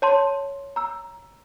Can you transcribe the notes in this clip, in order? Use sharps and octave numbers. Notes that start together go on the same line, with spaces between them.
C#5 A5 C6
A#5 E6